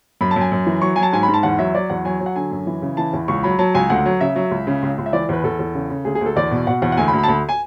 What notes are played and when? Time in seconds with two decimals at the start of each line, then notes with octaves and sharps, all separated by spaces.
0.21 F#2 B5
0.31 A5
0.36 F#2 G#5
0.52 F#2
0.66 E3
0.82 F#3 C#6
0.96 F#3 G#5
1.03 A5
1.13 G#2 G#5
1.23 B5
1.28 G#2
1.34 A5
1.43 E2 F#5
1.59 F#3 E5
1.74 F#3 D5
1.90 E2 F#5
2.05 F#3 G#5
2.20 F#3
2.26 F#5
2.36 D3 G#5
2.51 F#2
2.67 E3
2.82 C#3
2.97 E3 A5
3.13 E2
3.28 C#2 C#6
3.43 F#3 B5
3.59 F#3 A5
3.75 C#2 G#5
3.90 D2 F#5
4.06 F#3
4.21 C#3 E5
4.36 F#3
4.51 C#2
4.67 C#3
4.82 C#2
4.98 C#2
5.06 E5
5.13 E3 D5
5.29 E2 B4
5.44 E2 A4
5.59 E2
5.74 C#3
5.90 C#3
6.05 D2 G#4
6.15 G#4
6.21 D2 A4
6.36 E2 D5
6.51 B2
6.67 B2 F#5
6.82 E2 F#5
6.92 F#5
6.97 D2 G#5
7.08 B5
7.13 D2
7.18 B5
7.23 A5
7.28 D2 B5
7.49 G#5